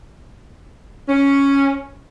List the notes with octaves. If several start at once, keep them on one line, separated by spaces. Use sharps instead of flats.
C#4